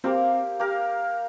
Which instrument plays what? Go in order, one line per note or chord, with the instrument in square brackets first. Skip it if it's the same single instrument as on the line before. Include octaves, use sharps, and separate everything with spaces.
[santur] A#3 G4 A#4 F5 [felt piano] C4
[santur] A#3 G4 A#4 F5